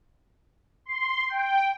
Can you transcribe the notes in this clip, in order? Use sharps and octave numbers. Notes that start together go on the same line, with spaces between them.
C6
G5